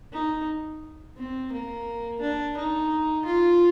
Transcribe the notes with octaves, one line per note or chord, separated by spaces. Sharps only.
D#4
C4
A#3
D4
D#4
F4